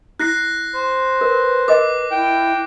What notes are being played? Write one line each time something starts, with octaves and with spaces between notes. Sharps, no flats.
E4 F#6 A#6 C7
C5
A#4 B4
A#4 D#5 G#5 D6
E4 G5